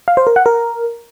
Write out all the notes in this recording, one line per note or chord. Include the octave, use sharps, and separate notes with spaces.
F5
C5
A#4
F#5
A#4